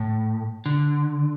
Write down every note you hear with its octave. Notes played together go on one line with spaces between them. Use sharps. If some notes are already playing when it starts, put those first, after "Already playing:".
Already playing: A2
D3